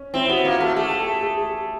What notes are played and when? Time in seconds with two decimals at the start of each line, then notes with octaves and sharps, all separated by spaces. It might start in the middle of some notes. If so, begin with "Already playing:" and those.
Already playing: C#4
0.14 C4 E4
0.29 B3 F#4
0.45 A#3 F4
0.60 A3 F#4
0.76 A3 G#4
0.91 G4
1.00 A4
1.07 G#4
1.23 G#4
1.38 G#4